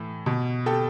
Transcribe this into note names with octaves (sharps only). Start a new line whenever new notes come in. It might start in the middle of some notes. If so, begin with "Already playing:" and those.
Already playing: A2 E3
B2
G4 A4